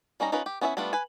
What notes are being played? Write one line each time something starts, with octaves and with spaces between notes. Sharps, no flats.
G3 C#4 D#4 A#5
C#4 D#4 F4 A#4 B4
G4
B3 C#4 E4 C#5 E5
G3 A3 B3 D4 F4
B4 G#5